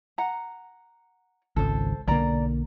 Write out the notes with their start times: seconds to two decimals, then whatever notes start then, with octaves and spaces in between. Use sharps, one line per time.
0.18 F#5 A#5
1.56 G#1 C#2 A4 C5
2.08 B1 D3 A#3 D5 A#5